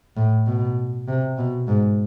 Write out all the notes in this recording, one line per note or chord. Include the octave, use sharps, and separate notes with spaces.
A2
B2
C3
B2
G#2